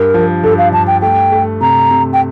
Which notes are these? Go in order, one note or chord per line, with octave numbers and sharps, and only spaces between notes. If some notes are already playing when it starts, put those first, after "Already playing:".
Already playing: G2 A#4
F3
G2 A4
F5
G2 A5
G5
A3 G5
A3
C3 A#5
C3
G5